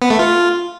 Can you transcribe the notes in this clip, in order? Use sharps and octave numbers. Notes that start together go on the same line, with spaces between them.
B3
A3
F4